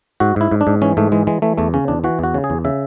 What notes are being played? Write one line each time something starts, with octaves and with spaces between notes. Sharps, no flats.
G#2 F#4
G#2 E4
G#2
D4
G#2
E3 C#4
G#2 A3
E3 G#3
E3 G#3
E3 A3
E2 A3
C#3 C#4
E2 D4
E3 F#4
E2 F#4
C#3
G#4
E2
C#3 E5